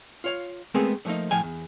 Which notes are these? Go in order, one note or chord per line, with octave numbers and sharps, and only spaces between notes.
F4 C#5 F5
G#3 A3 B3 C4 G#4 A#4
D3 F3 A3 A#3 D#4
A2 F3 F5 G5 G#5
E2